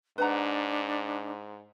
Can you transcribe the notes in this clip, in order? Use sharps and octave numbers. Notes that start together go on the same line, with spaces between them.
G#2 D4 B4 F#5 A#5